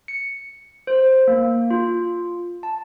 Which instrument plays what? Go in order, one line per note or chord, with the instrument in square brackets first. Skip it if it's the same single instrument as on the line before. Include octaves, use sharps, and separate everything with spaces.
[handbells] C#7
C5
A#3
F4
A5